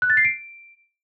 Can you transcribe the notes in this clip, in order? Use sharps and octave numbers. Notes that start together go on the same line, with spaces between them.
F#6
A6
C7
D7